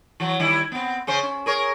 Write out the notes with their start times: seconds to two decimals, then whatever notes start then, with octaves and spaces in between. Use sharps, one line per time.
0.20 E3 F#3
0.40 D#3 G3 E4
0.72 B3 C4
1.07 C#3 C#4 C5
1.23 C#4
1.46 G#4 A#4 C#5